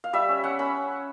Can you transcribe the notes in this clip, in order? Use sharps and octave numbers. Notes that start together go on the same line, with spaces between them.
F5
G3 E5
C#4
C#4 F#5
C#4 B5